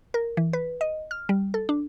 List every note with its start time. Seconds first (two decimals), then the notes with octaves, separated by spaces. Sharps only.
0.14 A#4
0.37 E3
0.53 B4
0.81 D#5
1.11 F6
1.29 G3
1.54 A4
1.69 D4